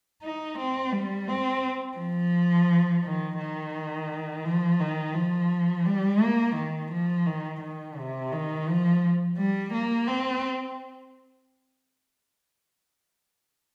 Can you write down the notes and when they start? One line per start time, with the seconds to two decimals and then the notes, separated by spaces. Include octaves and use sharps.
0.23 D#4
0.58 C4
0.92 G3
1.29 C4
1.98 F3
3.04 D#3
3.39 D#3
4.45 F3
4.80 D#3
5.15 F3
5.86 G3
6.22 A#3
6.56 D#3
6.91 F3
7.26 D#3
7.62 D#3
7.98 C3
8.32 D#3
8.68 F3
9.38 G3
9.73 A#3
10.08 C4